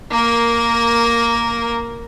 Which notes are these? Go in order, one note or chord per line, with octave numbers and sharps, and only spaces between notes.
A#3 A#4